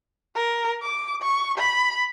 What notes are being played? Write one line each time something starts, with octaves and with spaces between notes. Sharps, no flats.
A#4
D6
C#6
B5